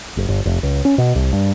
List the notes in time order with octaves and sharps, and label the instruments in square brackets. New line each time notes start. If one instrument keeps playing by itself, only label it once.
[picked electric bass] F#1
G1
F1
C#2
C#4
B2
C2
G2